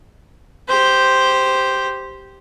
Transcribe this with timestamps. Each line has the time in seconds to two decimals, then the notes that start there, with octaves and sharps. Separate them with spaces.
0.68 G4 C5